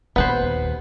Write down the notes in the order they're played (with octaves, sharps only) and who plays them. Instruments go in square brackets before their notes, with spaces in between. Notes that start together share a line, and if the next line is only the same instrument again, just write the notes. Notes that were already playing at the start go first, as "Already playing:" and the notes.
[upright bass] A#1 D#2 [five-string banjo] B3 B4 C5